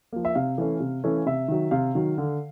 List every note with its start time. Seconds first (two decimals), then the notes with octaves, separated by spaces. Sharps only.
0.13 F3 A#3
0.25 E5
0.35 C3 F5
0.58 E3 A3 C#4
0.80 C3
1.04 E3 A3 C#4
1.26 C3 E5
1.48 D#3 F#3
1.71 C3 F5
1.95 D#3 F#3
2.18 D3